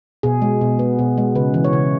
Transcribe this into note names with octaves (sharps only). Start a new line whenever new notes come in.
B2 G#4
G#3
B2
B3
B2
G#3
C#3 B4
E3
C#5
C#3